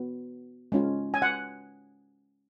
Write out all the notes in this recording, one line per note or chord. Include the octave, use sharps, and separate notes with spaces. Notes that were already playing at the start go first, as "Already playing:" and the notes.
Already playing: B3 F#4
G#3 C#4 F4
G#5
F#5